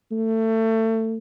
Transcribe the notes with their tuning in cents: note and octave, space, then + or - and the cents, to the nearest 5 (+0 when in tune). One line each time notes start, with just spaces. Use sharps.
A3 +25